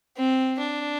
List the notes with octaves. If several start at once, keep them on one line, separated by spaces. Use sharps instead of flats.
C4
D4